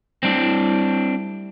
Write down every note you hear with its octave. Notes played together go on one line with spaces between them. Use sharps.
G3 A3 C4 D4 E4